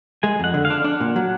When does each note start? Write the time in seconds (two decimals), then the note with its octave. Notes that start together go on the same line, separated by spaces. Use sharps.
0.23 G#3 G#5
0.40 F2 F#5
0.54 D3
0.65 F5
0.70 D4
0.84 D4 F#5
1.00 A#2
1.16 F#3